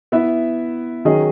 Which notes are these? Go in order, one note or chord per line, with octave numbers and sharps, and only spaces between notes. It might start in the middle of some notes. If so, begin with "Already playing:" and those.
B3 E4 B4 E5
D#3 F#3 C#4 G#4 D#5